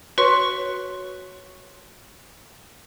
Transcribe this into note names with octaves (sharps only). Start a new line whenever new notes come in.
F#4 B4 C#5 C6 C#6